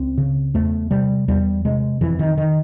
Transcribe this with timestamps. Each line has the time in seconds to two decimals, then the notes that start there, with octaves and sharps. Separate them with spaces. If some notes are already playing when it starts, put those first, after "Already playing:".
Already playing: C#2 C4
0.18 C#3
0.54 E2 A3
0.91 C3 G3
1.28 E2 G3
1.65 C3 G#3
2.01 F2 E3
2.19 D#3
2.38 D#3